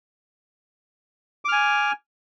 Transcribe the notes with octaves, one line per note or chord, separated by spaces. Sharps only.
G#5 D6 F6